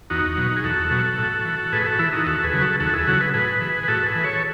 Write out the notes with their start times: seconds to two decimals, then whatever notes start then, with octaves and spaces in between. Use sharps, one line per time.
0.10 E2 D#4 F#4
0.37 B2 F#3
0.56 G#4
0.64 E2 F#4 A4
0.91 B2 F#3
1.18 A2
1.45 E3
1.72 A2 G#4 B4
1.86 F#4 A4
1.99 E3 E4
2.13 D#4 F#4
2.26 D#2 F#4 A4
2.43 G#4 B4
2.53 C#3 F#3
2.62 F#4 A4
2.80 D#2 F#4 A4
2.93 E4 G#4
3.07 C#3 F#3 F#4 A4
3.21 G#4 B4
3.34 A2 G#4 B4
3.61 E3
3.83 B4
3.88 A2 F#4 A4
4.06 G#4 B4
4.15 E3
4.24 A4 C#5